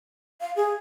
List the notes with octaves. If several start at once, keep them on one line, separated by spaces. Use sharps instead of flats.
F5
G#4